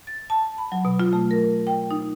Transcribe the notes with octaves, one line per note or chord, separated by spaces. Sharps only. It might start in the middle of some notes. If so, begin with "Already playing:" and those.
A6
A5
B5
F#3
B2
F4
A3
A#4
G5
D#4